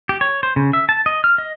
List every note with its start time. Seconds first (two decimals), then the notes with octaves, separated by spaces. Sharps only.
0.09 G4
0.21 C#5
0.43 C5
0.56 C#3
0.73 E5
0.89 A5
1.06 D#5
1.24 F6
1.38 D#5